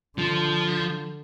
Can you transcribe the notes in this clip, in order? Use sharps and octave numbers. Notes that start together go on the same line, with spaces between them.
D3 F3